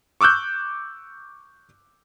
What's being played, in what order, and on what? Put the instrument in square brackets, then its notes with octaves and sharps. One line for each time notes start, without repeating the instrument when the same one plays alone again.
[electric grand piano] C#6 D6 E6 F#6 G6